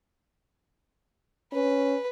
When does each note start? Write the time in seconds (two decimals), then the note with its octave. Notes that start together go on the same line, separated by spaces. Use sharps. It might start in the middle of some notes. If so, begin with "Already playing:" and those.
1.53 C#4 B4